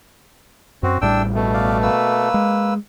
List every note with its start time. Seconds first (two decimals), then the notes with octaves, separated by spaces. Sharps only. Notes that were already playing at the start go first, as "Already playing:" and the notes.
0.83 F#2 C4 F#4
1.01 A1 A2 G3 D4 G5 E6
1.35 B2 A3
1.54 D5 F5
1.83 A#3 B4 E6
2.34 G#3